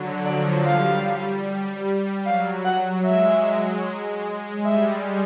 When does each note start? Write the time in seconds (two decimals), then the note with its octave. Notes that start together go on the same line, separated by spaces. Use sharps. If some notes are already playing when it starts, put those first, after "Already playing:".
Already playing: D3 F#3
0.25 F3 D5
0.66 G3 F5
2.25 F#3 F5
2.65 F#5
3.05 G#3 E5
4.65 G3 E5